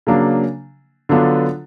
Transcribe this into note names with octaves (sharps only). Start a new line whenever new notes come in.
C#3 F#3 A#3 D4
D3 F#3 B3 D4 F4